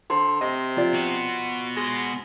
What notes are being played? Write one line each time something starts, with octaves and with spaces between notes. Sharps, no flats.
D3 C5
C3 D#5
F3 F4 D5
B3 F#4
G#3